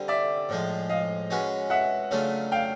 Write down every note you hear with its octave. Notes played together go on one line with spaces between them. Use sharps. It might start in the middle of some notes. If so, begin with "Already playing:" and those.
Already playing: D3 G3 C4
D5 E5
A2 F3 G#3
D#5 F5
G#3 C#4 F#4 B4
E5 F#5
C#3 F#3 A3 D4 F4
F5 G5